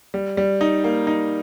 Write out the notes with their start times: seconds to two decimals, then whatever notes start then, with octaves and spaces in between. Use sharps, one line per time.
0.14 G3
0.37 G3
0.61 D#4
0.84 A#3
1.07 D#4